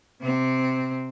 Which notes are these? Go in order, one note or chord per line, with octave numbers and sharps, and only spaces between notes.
C3 C4